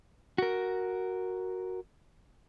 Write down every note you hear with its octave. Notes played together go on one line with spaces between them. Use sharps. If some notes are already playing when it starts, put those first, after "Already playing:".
F#4 A#4